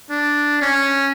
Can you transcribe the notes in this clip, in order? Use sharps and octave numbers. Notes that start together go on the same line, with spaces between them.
D4
C#4